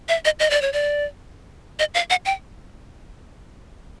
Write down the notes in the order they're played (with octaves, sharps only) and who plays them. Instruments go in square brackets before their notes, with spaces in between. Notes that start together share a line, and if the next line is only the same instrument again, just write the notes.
[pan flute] E5
D#5
D#5
D5
C#5
D5
D#5
F5
F#5
G5